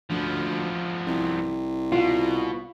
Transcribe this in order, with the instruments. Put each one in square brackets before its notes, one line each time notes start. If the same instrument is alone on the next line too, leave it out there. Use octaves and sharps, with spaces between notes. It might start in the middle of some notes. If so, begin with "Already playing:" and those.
[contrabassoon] D2 [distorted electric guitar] F3 B3
[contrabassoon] C2
[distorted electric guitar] B2 [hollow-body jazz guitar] F4